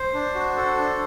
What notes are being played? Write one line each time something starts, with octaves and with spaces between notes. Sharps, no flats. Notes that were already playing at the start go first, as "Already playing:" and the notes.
Already playing: C5
D4
F#4
A4
D4